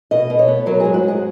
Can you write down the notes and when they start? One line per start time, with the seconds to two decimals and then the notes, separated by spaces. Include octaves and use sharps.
0.11 B2 D#5
0.30 B2
0.39 C#5
0.48 B3
0.66 F#3 A#4
0.80 G#4
0.85 G#2
0.94 F#4
1.03 G#2
1.08 G#4